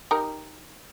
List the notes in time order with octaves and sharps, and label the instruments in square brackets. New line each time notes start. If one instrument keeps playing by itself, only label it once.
[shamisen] D#4 G4 A#4